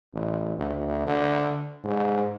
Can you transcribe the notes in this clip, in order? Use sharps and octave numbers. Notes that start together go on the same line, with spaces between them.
A1
D2
D3
G#2